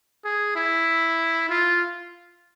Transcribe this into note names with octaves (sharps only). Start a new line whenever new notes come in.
G#4
E4
F4